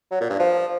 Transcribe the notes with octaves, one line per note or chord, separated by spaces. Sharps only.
F#3
A#2
G2
F3